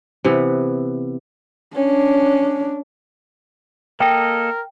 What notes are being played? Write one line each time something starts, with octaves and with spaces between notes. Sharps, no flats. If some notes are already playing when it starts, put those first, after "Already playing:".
C3 E3 B3
C#4 D4
A#3 A4 A#4 D#5 G5